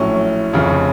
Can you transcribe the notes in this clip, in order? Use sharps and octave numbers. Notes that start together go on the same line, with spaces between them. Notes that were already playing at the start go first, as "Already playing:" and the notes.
Already playing: A#1 A2 F#3 C#4
F1 F2 C#3